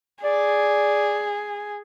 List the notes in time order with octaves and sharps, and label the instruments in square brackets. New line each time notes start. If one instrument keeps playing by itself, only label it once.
[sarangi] G#4 [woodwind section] D5